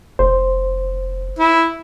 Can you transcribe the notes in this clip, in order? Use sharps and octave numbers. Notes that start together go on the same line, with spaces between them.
F1 C5
E4